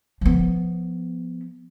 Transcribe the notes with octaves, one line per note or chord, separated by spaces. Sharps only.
F3 B3